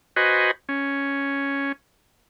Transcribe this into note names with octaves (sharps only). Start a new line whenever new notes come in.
F#4 B4 C5 D#5 G#5
C#4